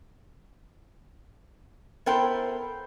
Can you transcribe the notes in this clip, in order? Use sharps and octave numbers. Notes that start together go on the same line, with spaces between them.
B3 E4 A4 A#4 C5 G5